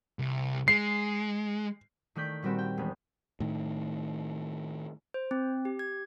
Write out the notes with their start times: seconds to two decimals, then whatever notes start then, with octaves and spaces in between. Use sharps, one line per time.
0.19 C2
0.68 G#3 C7
2.15 D#3 A3 D5 G6 B6
2.43 A#2 G3 C4 F#4 G4
2.58 G5
2.77 E1 G#3 B3
3.40 A2 D#3
5.14 C5
5.31 C4
5.65 G4
5.79 G#6